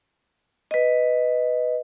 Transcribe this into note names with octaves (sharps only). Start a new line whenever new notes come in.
B4 D#5